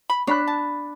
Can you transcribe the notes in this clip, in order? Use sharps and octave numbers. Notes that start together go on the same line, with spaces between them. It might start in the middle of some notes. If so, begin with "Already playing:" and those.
B5
D4 C#5 B5 F#6
A5